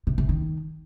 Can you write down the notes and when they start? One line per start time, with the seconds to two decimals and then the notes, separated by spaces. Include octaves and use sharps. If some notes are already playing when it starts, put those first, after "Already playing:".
0.07 C3
0.18 C3
0.29 D#3